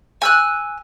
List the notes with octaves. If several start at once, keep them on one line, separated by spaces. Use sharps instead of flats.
G#5 E6 F#6